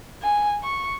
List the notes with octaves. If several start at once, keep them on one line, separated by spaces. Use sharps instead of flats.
G#5
C#6